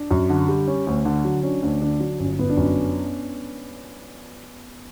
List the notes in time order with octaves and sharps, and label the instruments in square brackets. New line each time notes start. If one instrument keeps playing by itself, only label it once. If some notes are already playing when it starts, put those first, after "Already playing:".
Already playing: [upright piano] D4
[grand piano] F#2
D3
G3
C#4
D2
D3
F#3
[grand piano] C#4 [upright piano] D4
[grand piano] D2 [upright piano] D4
[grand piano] D3 [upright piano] D4
[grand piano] F#3 [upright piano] D4
[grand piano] G1 [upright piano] C#4
[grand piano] G1 [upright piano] B3
[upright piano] D4
[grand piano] F#2 [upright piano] C#4